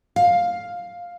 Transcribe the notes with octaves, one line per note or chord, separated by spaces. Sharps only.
F5